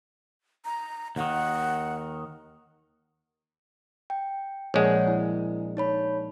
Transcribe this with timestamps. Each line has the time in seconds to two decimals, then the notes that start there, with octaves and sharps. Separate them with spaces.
0.65 A#5
1.16 D#2 D#3 F#5
4.10 G5
4.74 A#1 G#3 C#5 F#5
5.08 E4
5.77 D#4 C#5 B5